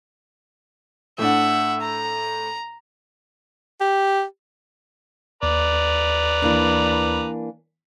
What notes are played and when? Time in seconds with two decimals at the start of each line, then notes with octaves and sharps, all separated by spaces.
1.18 A2 D4 E5 F#5
1.81 A#5
3.81 G4
5.43 D#2 B4 D5 A#5
6.42 E3 A#3 D4